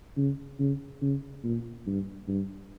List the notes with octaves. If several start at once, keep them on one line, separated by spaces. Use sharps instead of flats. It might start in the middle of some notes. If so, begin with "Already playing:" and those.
C#3
C#3
C#3
A#2
G2
G2